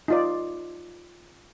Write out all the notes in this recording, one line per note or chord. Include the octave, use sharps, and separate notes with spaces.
D#4 F4 D5